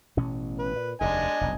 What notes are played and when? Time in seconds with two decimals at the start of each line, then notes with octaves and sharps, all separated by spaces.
0.17 A1 B2 C#4
0.59 B4
0.76 A#2
1.01 F1 D#2 D4 D#5 G#5
1.41 F1 B1